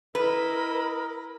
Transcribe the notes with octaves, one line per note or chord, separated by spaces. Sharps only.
E4 A#4 B4 D#5 B5